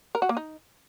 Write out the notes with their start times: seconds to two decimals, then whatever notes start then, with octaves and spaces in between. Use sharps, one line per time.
0.15 A#4
0.22 F#4
0.29 A#3
0.37 D#4